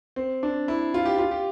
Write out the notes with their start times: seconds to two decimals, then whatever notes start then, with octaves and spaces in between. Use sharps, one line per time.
0.16 C4
0.43 D4
0.68 E4
0.94 F4
1.05 G4
1.18 F4
1.31 G4